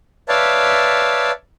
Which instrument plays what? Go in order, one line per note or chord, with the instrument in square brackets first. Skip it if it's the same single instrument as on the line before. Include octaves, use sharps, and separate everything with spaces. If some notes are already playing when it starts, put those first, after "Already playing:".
[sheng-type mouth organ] B4 C#5 D5 E5 F5 A5